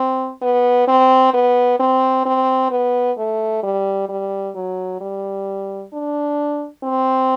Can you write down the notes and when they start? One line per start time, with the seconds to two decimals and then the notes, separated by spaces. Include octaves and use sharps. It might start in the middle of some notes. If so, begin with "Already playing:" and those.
Already playing: C4
0.42 B3
0.88 C4
1.34 B3
1.80 C4
2.26 C4
2.71 B3
3.18 A3
3.64 G3
4.09 G3
4.55 F#3
5.01 G3
5.93 D4
6.84 C4